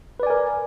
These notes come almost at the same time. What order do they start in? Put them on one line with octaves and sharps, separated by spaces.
B4 D5 G#5 A#4